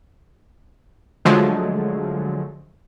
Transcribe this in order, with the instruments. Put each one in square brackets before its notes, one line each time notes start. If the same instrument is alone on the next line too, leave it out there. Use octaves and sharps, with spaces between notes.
[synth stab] D3 F3 F#3 G#3 A3